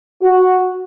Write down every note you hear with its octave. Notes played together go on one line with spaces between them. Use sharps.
F#4